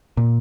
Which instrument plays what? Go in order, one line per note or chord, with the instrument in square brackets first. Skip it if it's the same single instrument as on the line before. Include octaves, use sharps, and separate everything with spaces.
[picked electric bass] A#2